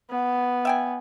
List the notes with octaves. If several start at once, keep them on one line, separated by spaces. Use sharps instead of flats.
B3
E5 G5 G#5